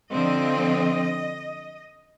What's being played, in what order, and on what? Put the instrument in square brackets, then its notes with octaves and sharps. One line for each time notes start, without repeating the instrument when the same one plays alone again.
[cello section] D3 F3 C4 D#5